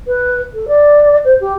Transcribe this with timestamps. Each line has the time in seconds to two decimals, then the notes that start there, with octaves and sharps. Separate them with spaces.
0.07 B4
0.54 A4
0.68 D5
1.24 C5
1.40 G4